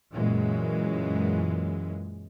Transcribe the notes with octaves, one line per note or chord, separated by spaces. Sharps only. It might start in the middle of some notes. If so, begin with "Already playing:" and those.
F#2 A#2 E3 G#3